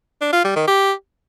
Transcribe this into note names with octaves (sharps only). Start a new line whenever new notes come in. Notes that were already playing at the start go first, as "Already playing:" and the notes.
D4
F4
G3
D#3
G4